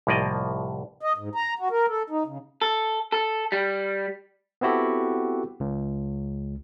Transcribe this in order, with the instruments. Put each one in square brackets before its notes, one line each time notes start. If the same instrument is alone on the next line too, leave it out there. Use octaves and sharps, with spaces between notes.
[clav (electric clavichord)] C2 A2 F3 A#3 D5 D#5
[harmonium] D#5
G#2
A#5
F#4
A#4
A4
D#4
C#3
[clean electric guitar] A4
A4
G3
[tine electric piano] B3 C4 E4 F#4 G4 A4
C#2